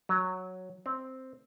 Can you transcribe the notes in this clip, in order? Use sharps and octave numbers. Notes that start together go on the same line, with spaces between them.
F#3
C4